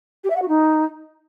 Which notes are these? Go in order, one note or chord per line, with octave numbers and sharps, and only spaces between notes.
G4
E5
F#5
F#4
D#4